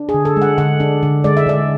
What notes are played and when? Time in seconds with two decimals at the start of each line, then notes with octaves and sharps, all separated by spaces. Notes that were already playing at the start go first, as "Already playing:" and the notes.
Already playing: D4
0.09 G#4
0.14 D3
0.25 A4
0.36 G#3
0.42 F#5
0.58 D3 F#5
0.80 D4
1.03 D3
1.24 G#3 D5
1.37 E5
1.47 D3 D5